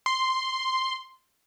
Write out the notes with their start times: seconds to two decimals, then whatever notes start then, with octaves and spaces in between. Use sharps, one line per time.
0.06 C6